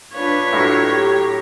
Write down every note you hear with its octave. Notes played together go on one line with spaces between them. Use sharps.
D4 F4 B4 C#5
A2 F#3
G4